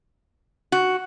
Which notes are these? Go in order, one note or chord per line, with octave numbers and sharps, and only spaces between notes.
F#4